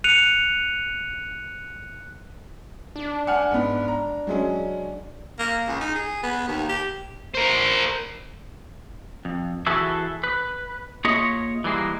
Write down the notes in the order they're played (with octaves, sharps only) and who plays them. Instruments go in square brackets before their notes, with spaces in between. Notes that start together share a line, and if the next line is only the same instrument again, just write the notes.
[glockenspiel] F#6 C#7 D#7 F7
[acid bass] D4
[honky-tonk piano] F#5 G#5 F6
G#2 B3
A#5
F#3 G#3 C#4
[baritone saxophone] A#3
C#2
D#4
G#4
B3
D#2
G4
[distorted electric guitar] A#4 C5
[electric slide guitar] F2
E3 F#4 G#4 A4 B4 E5
B4
A#3 F4 G#4 C#5 D#5 E5
E3 G3 G#3 A#3